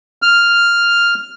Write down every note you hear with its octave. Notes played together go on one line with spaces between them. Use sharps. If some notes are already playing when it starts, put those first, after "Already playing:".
F6